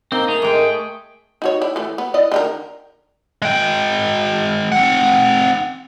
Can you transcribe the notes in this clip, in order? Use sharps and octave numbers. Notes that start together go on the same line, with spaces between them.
A#3 C4 D#4 A#4 G7
A3 G#4 F7
G#2 G#3 G5
D#4 F#4 C#5
E4 D5
E3 A3
B3
E4 D5 D#5
D3 D#3 A#4
G#3 G5
C4 F#5